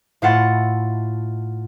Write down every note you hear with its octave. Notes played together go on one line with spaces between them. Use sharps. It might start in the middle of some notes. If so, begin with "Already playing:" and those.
A2 E4 F4 A4 F#5 A6